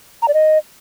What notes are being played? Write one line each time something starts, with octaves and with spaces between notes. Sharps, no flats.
A#5
D5
D#5